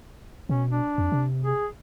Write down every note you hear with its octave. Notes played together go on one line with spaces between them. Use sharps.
B2 C#4
D4
F2
C3
G#4